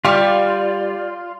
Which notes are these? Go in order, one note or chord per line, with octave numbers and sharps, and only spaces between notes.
G3 F4 G4 D5